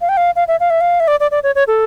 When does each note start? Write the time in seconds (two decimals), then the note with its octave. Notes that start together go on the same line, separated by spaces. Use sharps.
0.01 F5
0.09 G5
0.17 F5
0.36 F5
0.48 E5
0.60 F5
0.70 E5
0.81 F5
1.00 E5
1.08 D5
1.20 D5
1.31 D5
1.43 C#5
1.55 C#5
1.68 A4